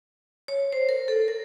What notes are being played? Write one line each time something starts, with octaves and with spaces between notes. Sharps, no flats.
C#5
C5
A#4
A4
A#4